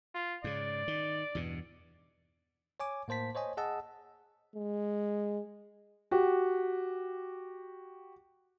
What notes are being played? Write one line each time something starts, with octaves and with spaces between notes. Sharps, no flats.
F4
G#2 C#3 D5
D#3
E2 G2 B2
C#5 G#5 D6
A2 A#3 C5 A5 B6
C5 C#5 D#5 G#5
G#4 D#5 F#5 A5 E6
G#3
F#4 G4